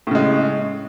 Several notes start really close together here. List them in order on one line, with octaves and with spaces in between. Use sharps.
A2 C#3 G#3